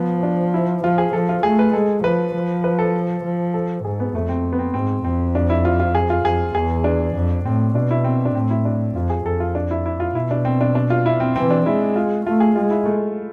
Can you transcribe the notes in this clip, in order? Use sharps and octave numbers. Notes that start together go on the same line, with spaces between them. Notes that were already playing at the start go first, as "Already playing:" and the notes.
Already playing: F3 B3
D4
E4
F3 F4
G#4
F3 A4
F4
A3 G#4
B4
G#3 A4
F3 B4
F3
B4
A4
F3
A4
G#2 G#4
B3
F2 A3
C4
B3
C4
G#2 C4
F2 C4
D4
E4
F4
F4
G#4
F4
F2 G#4
E2 G#4
D4
F2
A2 C4
B2 D4
E4
C4
D4
A2 C4
E4
D4
F2 F4
G#4
F2 A4
F4
D4
E4
E4
F4
B2 E4
D4
C4
D4
D4
F4
E4
C4
E3 C4
D4
G#3 E4
F4
A3 F4
G#4
G#3 F4
E4
A3